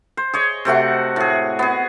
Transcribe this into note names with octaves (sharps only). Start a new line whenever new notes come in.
C5
G#4 C#5 D#5
C3 A3 F#4 F#5
A2 G#4
B3 G#4